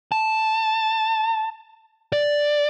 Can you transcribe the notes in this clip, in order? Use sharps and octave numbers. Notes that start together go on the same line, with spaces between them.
A5
D5